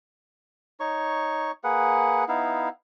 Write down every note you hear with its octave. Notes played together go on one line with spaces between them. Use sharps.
D#4 C#5 C#6
A#3 G#4 B4 F#5
B3 D#4 E4 F5